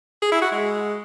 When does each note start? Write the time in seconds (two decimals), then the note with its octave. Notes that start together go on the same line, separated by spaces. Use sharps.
0.22 G#4
0.32 E4
0.42 F#4
0.52 G#3